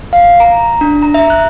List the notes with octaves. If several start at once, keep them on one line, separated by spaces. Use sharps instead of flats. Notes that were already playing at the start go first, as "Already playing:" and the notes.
F5
A#5
D4
A#5
E5
F#6